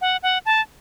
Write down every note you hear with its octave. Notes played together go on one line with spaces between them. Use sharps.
F#5
F#5
A5